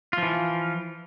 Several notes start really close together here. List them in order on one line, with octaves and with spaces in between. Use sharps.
F4 F3 E3